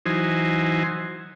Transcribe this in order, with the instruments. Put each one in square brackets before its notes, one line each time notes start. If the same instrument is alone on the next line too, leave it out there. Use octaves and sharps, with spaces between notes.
[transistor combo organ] E3 F#3 D#4 C5 G#5